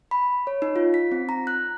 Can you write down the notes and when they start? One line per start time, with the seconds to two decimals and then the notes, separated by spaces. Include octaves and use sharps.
0.11 B5
0.47 C#5
0.62 D#4
0.76 F4
0.94 B6
1.12 C4
1.29 A#5
1.47 F#6